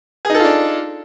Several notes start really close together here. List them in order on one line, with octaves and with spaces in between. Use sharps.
G#4 D#4 A4 F4 D4